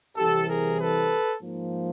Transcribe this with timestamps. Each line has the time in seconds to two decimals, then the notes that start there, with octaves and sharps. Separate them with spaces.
0.16 C2 C3 E3 G4 A4
0.48 G#4 A#4
0.79 A4 B4
1.41 G#2 F3 A#3